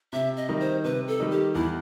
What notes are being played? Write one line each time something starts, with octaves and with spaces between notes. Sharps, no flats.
C3 E5
D#5
D#3 G3 D#4
C5
C3 B4
A4
D#3 G3 D#4
G4
E2 E4